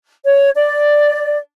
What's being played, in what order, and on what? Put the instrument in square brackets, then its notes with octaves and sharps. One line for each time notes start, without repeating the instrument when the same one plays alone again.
[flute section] C#5
D5